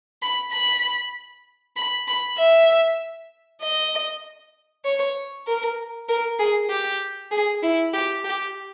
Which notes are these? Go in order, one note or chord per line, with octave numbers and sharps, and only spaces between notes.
B5
B5
B5
B5
E5
D#5
C#5
A#4
A#4
G#4
G4
G#4
E4
G4
G4